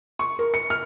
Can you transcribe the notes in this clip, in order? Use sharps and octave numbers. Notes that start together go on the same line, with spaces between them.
C#6
A#4
C#7
F6